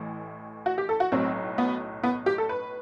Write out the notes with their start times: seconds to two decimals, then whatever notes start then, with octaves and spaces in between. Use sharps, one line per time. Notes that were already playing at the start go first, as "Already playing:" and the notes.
Already playing: A1 A2 E3
0.66 F#4
0.78 G4
0.89 A4
1.00 F#4
1.12 B1 A2 F#3 C4
1.58 B3
2.03 B3
2.26 G4
2.38 A4
2.49 B4